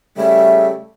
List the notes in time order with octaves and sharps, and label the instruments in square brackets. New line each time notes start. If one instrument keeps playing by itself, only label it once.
[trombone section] C#3 G3 A3 [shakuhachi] E5